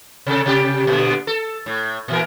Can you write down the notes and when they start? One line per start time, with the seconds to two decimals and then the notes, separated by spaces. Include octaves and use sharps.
0.27 C3 A4
0.46 C3 G4
0.87 A#2 D3
1.27 A4
1.66 A2
2.08 A#2 E3 A#4